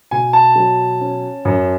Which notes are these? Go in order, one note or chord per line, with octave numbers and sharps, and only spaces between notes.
B2 G#5
A5
F#3
C#4
F#2